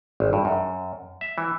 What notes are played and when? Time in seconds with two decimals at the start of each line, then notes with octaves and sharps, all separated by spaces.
0.20 G#1
0.33 G2
0.45 F#2
1.21 E5
1.38 E3